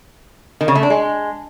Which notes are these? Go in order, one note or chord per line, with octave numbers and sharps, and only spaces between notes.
D#3
C#3
A3
D4
G#3